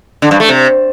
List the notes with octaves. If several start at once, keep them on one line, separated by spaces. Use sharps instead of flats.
D3
G2
A3
C3